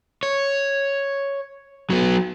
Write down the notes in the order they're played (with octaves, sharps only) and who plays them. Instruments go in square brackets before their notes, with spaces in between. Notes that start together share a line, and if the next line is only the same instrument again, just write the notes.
[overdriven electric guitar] C#5
F#3 B3